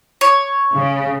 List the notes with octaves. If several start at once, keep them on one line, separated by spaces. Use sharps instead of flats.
C#5
C#3